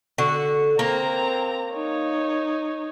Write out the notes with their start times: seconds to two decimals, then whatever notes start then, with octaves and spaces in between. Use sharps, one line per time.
0.18 D3 F#4
0.79 A#3 C4 A#5
1.71 D#4 C#5